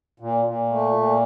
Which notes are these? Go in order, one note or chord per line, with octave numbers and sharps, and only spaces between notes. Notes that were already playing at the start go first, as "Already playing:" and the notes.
A#2
A#2
A3
A#2